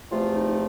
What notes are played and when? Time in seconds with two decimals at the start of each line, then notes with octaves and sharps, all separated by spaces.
0.11 E2 C3 F3 A3 F4
0.35 D#4